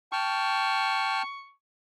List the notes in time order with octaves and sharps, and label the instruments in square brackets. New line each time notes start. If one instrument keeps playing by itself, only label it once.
[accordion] G5 A5 F6 [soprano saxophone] C#6